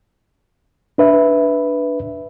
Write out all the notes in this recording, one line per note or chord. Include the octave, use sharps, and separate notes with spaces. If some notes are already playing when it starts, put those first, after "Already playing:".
D4 B4 E5